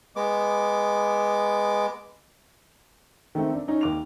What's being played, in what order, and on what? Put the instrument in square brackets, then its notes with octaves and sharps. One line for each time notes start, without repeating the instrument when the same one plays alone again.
[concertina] G#3 B3 D6
[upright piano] D#3 A3 C4 D#4
D4
C#4 D#4
D#2 D6 F7